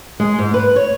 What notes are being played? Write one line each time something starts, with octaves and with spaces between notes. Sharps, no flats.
G#3
G#2
B4
C#5